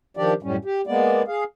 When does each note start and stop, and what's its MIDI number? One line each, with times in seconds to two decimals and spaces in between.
0.17 0.34 51
0.17 0.34 53
0.17 0.34 62
0.17 0.34 67
0.17 0.34 74
0.43 0.56 42
0.43 0.56 45
0.43 0.56 55
0.43 0.56 61
0.65 0.81 67
0.87 1.22 56
0.87 1.22 58
0.87 1.22 59
0.87 1.22 74
1.28 1.44 68
1.28 1.44 77